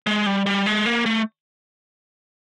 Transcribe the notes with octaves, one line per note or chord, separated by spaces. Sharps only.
G#3
G3
G3
G#3
A#3
A3